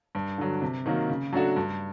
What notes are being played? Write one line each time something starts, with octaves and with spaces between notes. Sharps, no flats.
G2
D3 F#3
C3
D#3 F#3 A#3
C#3
F#3 A3 D4 F#4
G2